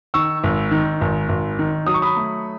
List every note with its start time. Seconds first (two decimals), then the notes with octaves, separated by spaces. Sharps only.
0.14 D#3 C#6 E6
0.44 G#1
0.71 D#3
1.01 G#1
1.29 G#1
1.59 D#3
1.87 F#3 D#6
1.94 C#6
2.02 B5 D#6
2.16 A3